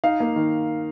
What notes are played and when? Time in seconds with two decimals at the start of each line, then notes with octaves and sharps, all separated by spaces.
0.04 D#4 F5
0.20 A#3
0.36 D#3